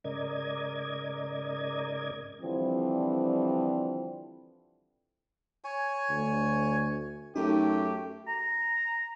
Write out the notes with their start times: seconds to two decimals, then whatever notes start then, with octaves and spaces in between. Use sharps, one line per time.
0.04 G#2 C#3 A#4 D5 D#5 G#6
2.40 D3 E3 F3 G3 C4
5.64 C#5 G#5
6.10 D2
7.36 F#2 A3 D#4 G4
8.28 A#5